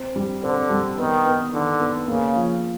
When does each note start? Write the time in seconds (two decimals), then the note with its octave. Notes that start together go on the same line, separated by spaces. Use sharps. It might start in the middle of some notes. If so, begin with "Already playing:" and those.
Already playing: C4
0.16 G3
0.43 D3 C4
0.70 G3
0.98 D#3 B3
1.26 B3
1.53 D3 D#3
1.80 B3
2.07 C#3 A#3
2.35 F3